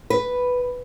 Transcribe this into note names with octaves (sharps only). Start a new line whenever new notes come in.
B4